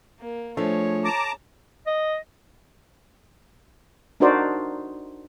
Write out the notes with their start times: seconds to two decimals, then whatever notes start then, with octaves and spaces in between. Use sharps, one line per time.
0.20 A#3
0.57 F3 A3 D4 G#4 C#5
1.04 A5 A#5 D6
1.87 D#5
4.20 D4 D#4 F#4 A#4 C5 D5